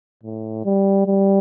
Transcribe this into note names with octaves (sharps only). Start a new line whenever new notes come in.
A2
G3
G3